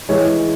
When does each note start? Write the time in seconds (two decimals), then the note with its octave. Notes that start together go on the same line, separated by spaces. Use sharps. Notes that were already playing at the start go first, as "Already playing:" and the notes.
0.09 E3 G#3 C#5